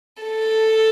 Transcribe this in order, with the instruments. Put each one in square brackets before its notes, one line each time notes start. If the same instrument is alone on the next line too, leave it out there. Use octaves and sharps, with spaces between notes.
[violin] A4